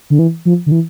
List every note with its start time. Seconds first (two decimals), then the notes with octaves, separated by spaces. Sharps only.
0.10 D3
0.19 E3
0.45 F3
0.66 D3
0.72 E3